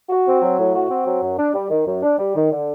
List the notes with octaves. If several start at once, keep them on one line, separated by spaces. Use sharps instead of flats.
F#4
C4
F#3
A2
F#4
C4
F#3
F#2
D4
G3
D#3
F#2
D4
G3
D#3
D3